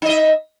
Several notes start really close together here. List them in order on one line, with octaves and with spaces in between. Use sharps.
D#4 D#5 E5